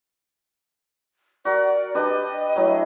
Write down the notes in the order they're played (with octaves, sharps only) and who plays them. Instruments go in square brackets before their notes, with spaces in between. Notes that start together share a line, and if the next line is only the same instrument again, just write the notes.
[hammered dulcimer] F#4 A#4 [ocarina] D5
[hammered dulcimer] D4 G4 B4 [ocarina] D#5
[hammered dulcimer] F#3 A3 E4